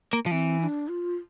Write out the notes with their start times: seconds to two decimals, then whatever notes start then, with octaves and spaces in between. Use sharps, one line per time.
0.13 A#3
0.26 F3
0.31 E3 C4
0.60 E4
0.64 D4
0.88 F4